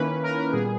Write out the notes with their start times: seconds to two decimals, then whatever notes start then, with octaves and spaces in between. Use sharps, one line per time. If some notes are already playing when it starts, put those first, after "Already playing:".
Already playing: D#3 A#3 C#4 E4 B4
0.23 A#4
0.52 A#2 G3 B3 G#4